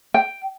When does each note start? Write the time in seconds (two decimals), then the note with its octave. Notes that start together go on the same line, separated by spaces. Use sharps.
0.14 G5